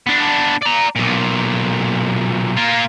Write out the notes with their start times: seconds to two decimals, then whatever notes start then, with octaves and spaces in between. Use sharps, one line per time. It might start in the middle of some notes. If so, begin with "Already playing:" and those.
0.07 B3 D4
0.63 D5 A#5
0.96 B1 A#2
2.57 A#3 F4